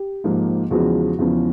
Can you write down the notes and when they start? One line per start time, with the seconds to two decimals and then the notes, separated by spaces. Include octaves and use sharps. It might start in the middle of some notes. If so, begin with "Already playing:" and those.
Already playing: G4
0.24 G#2 F3 A#3
0.71 E2 C#3 F3 G#3 B3 F#4
1.19 E2 C#3 F3 G#3 B3